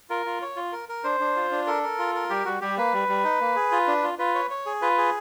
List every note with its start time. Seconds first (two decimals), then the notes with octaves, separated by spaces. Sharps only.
0.10 F4 A#4
0.26 F4
0.42 C#5
0.56 F4
0.72 A#4
0.89 A#4
1.04 D4 C5
1.20 D4
1.36 F4
1.51 D4
1.67 A4 A#4
1.83 A#4
1.98 F4
2.15 A#4
2.30 G3 G4
2.45 G3 F#4
2.61 G3 G4
2.78 A#3 B4
2.93 G3
3.08 G3
3.24 D#4
3.40 A#3
3.56 G#4
3.72 F4
3.87 D4
4.03 F4
4.19 F4 B4
4.35 C#5
4.50 C#5
4.66 G#4
4.82 F4 B4
4.98 G#4